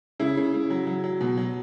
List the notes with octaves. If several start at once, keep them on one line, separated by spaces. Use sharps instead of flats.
C#3 E4
C#3
C#3
F#3
F#3
F#3
B2
F#3